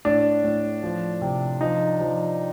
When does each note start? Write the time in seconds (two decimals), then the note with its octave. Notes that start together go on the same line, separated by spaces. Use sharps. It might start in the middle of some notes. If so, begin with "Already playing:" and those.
0.05 A2 D4
0.44 A2
0.83 F3
1.22 C3
1.61 F3 D#4
2.00 F3